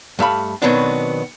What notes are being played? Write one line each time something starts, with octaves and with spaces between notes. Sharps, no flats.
G2 A3 F5 B5
B2 D#3 F#3 B3 C4 D4